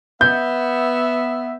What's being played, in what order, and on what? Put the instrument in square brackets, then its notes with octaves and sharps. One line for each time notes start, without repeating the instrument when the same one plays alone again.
[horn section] B3 E5 [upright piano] G6